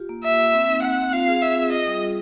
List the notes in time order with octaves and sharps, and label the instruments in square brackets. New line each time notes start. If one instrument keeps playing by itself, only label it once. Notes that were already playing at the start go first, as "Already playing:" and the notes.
Already playing: [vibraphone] F4 G4
A#3
[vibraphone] A#3 [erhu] E5
[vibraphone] A#3
C4
D#4
[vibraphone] C4 [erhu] F#5
[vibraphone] C4
[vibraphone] F4 [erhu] F5
[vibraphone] G#4
[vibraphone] G#4 [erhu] E5
[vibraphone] G#4
[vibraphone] F4 [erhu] D#5
[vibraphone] G3
G3